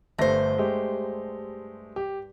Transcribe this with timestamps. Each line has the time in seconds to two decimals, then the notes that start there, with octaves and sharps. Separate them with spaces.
0.18 G1 G2 A3 C5 A#6
0.58 G#3 A3 G4
1.96 G4